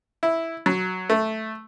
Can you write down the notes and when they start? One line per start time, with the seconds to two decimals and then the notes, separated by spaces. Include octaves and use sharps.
0.23 E4
0.66 F#3
1.10 A3